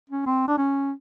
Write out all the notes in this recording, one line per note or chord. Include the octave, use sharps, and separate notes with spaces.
C#4
C4
D4
C#4